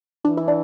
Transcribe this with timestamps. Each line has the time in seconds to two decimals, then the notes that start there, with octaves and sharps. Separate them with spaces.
0.25 E3 D4
0.37 E4
0.48 D4